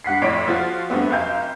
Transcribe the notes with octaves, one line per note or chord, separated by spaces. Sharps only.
G2 F#5 B6 C7
F2 A2 E4 C#5 D5 D7
F3 F4 F#4
G2 A3 B3 C4
F1 F#2 F5 G5 G6